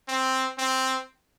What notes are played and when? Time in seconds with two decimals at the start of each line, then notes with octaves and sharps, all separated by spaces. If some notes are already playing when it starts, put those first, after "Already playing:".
0.08 C4
0.58 C4